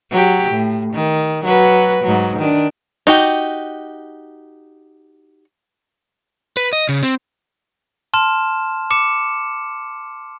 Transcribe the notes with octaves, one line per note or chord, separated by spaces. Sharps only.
F#3 G4
A2
D#3
F#3 F#4 B4
G#2 F#3
D#3 D4
D#4 F#4 G4
B4
D#5
C#3
C4
A5 C6 F6 E7
D6 C#7 E7